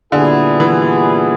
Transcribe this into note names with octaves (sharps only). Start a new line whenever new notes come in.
A#2 D3 G3 B3 E4 G#4
E3